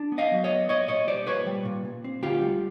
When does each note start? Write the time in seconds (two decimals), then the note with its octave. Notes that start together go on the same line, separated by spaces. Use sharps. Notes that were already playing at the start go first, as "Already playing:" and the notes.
Already playing: D4
0.12 B3
0.18 D#5 F5
0.32 F#3
0.44 C#5 D#5
0.50 B3
0.69 A#2 C#5 D#5
0.88 A#2 C#5 D#5
1.07 G3 C5 D5
1.27 A#2 B4 C#5
1.47 G3
1.65 A#2
1.85 A#2
2.04 C4
2.23 D2 F4 G4
2.42 G3